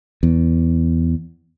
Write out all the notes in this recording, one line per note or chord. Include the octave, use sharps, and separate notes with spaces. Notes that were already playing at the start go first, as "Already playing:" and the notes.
E2